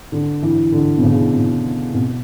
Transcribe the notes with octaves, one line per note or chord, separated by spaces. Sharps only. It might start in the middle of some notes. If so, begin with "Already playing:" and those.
D3
E3
D3
B2
C#3
B2
B2